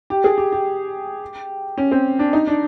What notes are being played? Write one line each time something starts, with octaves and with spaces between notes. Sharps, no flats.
G4
G#4
G4
G4
C#4
C4
D4
D#4
D4